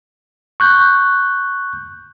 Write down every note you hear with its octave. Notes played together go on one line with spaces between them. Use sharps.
C#6 F#6 G6